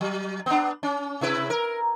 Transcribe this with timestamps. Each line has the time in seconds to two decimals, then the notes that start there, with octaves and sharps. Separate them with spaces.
0.01 F#3
0.46 B3 D4
0.83 C#4
1.21 C3 E4 B4
1.50 A#4